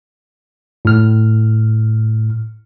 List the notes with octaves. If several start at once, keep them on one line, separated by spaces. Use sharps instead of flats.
A2 F6